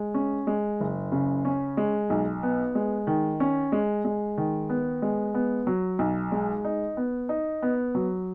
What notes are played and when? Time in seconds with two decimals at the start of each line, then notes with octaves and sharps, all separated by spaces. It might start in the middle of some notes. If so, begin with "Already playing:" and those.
Already playing: G#3
0.14 C#4
0.47 G#3
0.80 F#1
1.12 C#3
1.45 C#4
1.77 G#3
2.10 B1
2.43 B3
2.75 G#3
3.07 D#3
3.40 C#4
3.72 G#3
4.05 G#3
4.37 D#3
4.69 B3
5.02 G#3
5.34 B3
5.67 F#3
5.99 B1
6.32 G#3
6.65 D#4
6.97 B3
7.29 D#4
7.62 B3
7.95 F#3